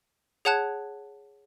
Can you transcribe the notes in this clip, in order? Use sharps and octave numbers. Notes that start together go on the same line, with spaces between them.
G#4 C#5 F#5 A5 F#6 G#6